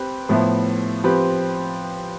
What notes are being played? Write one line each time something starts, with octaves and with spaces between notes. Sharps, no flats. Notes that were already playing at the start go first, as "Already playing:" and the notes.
Already playing: C4 G4 B4
A2 F3 B3 E4
F3 C4 G4 B4